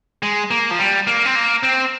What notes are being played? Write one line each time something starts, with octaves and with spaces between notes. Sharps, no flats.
G#3
A#3
F3
G3
A#3
C4
A#3
C4